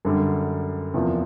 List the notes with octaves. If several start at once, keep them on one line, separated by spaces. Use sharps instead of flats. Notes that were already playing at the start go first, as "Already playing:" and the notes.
F#2 D3 G3
E2 C3 F3 A#3